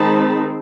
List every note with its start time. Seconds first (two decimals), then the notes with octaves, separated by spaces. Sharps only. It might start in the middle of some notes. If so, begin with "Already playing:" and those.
Already playing: D#3 G#3 C4 D#4 A5 B5